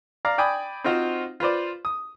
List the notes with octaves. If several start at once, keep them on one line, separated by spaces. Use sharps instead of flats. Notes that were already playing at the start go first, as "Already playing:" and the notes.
D5 F5 A#5
D5 G5 G#5 B5 D#6
C4 D#4 F4 F#4 C5
F4 B4 C5 D5
D#6